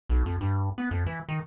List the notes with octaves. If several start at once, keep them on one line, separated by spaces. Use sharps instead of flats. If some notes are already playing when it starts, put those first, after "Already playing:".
B1
F2
G2
B3
F2
E3
D#3